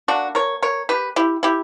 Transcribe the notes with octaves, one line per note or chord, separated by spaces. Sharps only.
D3 A#3 D4 F#4
A#4 C#5
A#4 C#5
G4 B4
E4 G4
E4 G4